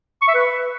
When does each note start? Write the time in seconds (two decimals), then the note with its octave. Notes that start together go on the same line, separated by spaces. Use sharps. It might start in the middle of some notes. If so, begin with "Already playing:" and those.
0.22 C#6
0.28 E5
0.34 B4